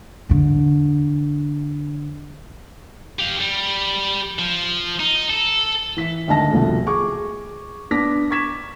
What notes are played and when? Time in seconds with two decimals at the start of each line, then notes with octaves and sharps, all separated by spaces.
0.29 E2 D3
3.19 G4 F5
3.41 G3
4.39 F3
5.00 D#4
5.30 A4
5.97 E3 B6
6.28 G#1 D2 D#5 A5 A#6
6.51 C2 F2 B2 F3 A3
6.86 G#4 C#6 D6
7.91 B3 D4 D6 A#6 B6
8.30 C#6 D6 G#6 B6 E7